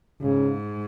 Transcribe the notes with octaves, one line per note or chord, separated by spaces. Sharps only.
G#2 C#3